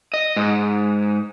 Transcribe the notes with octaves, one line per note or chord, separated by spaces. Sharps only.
D#5
G#2